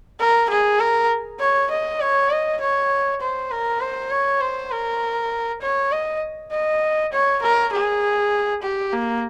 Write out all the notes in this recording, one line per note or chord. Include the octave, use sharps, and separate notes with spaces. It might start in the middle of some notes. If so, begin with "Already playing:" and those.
A#4
G#4
A#4
C#5
D#5
C#5
D#5
C#5
C5
A#4
C5
C#5
C5
A#4
C#5
D#5
D#5
C#5
A#4
G#4
G4
A#3